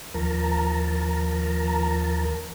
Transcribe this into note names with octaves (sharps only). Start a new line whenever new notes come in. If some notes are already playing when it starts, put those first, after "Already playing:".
D#2 F3 A#4 A5 A#5